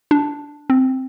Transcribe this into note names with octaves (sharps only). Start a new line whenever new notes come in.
D4
C4